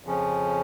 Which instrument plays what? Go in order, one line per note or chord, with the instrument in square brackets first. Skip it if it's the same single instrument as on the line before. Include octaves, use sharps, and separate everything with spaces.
[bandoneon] F2 C#3 F3 C#4